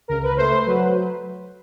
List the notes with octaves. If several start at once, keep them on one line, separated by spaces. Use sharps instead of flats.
C#2 A#4
B4
A3 C5
F#3 B4